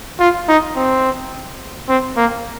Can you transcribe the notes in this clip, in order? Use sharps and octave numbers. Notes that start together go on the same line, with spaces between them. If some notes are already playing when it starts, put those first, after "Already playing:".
F4
D#4
C4
C4
A#3